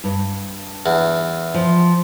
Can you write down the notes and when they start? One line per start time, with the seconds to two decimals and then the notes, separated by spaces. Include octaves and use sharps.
0.04 G2
0.86 E2
1.54 F3